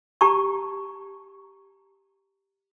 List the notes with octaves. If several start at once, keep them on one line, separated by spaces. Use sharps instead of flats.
G4 A5 A#5 C#6